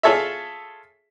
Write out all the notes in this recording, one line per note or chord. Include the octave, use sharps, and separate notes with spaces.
F4 G#4 A4 C#5 E5